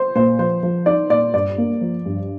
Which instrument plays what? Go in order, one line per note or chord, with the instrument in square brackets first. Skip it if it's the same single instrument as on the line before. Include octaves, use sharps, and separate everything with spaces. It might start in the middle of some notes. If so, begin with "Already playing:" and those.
Already playing: [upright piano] C5
[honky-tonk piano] A#2 [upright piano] C5
[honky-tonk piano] F3 [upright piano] C5
[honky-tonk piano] F3
[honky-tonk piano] D#4 [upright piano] D5
[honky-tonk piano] A#2 [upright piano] D5
[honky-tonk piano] G2 [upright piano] D5
[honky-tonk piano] A#3
F3
G2